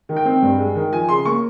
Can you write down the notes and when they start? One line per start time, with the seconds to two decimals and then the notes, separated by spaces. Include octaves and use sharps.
0.09 D#3
0.16 G5
0.25 C4
0.42 G2
0.58 G#3
0.75 D#3
0.92 F3 G#5
1.08 C#3 C6
1.25 A#3 C#6